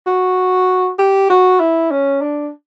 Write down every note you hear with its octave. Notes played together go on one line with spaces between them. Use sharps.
F#4
G4
F#4
E4
C#4
D4